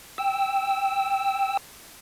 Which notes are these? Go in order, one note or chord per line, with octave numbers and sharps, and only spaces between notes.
G5 E6